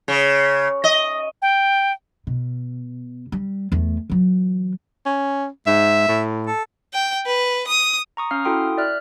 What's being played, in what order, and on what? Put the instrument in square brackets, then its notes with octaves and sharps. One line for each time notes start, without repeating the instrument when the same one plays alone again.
[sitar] C#3
D#5
[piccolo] G5
[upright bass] B2
G3
E2 A3
E3 F#3
[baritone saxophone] C#4
[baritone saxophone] G#2 [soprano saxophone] E5
[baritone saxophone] A2
[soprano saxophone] A4
[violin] G5
B4
D#6
[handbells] A#5 C#6 D#6
C#4 F5 F6
E4 F#4 A4 G5 C6 D#6
D5 E5 F6 F#6